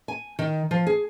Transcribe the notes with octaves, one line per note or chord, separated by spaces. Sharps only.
G#5
D#3
F3
G#4